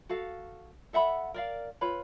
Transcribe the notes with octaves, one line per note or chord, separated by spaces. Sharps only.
F#4 A4 F5
A4 E5 F#5 B5
A#4 D5 F5
F4 B4 C#5 B5